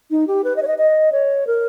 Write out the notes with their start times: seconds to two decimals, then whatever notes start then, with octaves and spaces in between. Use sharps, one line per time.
0.11 D#4
0.27 G4
0.44 B4
0.56 D#5
0.62 C#5
0.67 D#5
0.78 D#5
1.12 C#5
1.47 A#4